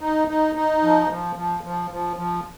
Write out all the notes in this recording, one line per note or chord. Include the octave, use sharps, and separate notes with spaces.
D#4
D#4
D#4
F3
F3
F3
F3
F3
F3